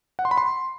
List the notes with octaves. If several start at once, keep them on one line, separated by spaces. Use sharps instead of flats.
F#5
C6
B5
C6